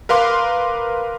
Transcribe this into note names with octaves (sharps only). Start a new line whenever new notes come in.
A#4 B4 F5 C6 D6